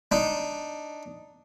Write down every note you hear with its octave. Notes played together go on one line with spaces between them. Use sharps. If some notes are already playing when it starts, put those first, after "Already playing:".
D4 D#4